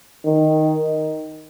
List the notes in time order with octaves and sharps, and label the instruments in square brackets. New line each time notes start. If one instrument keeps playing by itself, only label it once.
[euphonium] D#3